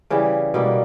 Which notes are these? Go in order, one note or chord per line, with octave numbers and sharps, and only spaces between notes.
C#3 E3 G3
B2 G3 A#3